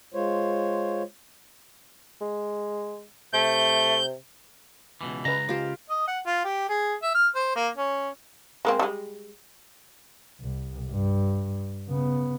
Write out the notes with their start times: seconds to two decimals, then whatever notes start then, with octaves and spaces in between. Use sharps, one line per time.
0.14 G#3 F4 C5 C#5
2.21 G#3
3.33 C3 A3 G6
5.01 C#2 B2 E3
5.25 C#2 C#3 B4 A5 A#5
5.49 G#3 F4 G4 C5
5.90 D#5
6.07 F#5
6.26 F4
6.44 G4
6.69 G#4
7.02 E5
7.15 F6
7.35 C5
7.56 A#3
7.76 C#4
8.65 G#3 A#3 C4
8.79 G3 G#3
10.41 C2
10.91 G2
11.88 C#3 B3